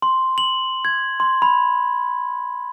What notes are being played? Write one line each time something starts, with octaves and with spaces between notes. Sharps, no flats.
C6
F#7
G#6
C6
B5